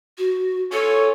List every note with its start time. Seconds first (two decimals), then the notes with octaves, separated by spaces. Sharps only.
0.18 F#4
0.72 C#4 F4 A4 C#5